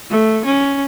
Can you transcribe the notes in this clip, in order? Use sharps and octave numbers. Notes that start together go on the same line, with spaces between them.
A3
C#4